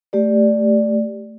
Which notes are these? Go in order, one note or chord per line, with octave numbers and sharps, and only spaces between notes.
A3 G4 D5